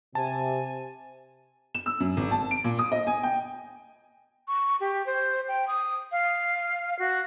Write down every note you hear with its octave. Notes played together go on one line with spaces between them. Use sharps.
C3 G#5 A5
E7
E6
F#2
G#1
A5
D7
A#2
D#6
D#5
G#5
G5
C#6
G4
C5
G5
D#6
F5
F#4